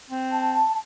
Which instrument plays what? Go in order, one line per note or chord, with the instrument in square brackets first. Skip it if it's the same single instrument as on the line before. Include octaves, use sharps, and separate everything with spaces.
[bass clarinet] C4
[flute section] A5